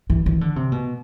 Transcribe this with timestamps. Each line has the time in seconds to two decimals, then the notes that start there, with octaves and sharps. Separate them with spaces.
0.10 E3
0.26 E3
0.41 D3
0.56 C3
0.72 B2